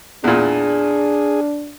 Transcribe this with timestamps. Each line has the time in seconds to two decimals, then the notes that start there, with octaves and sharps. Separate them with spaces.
0.24 E2 A#2 D4 G#4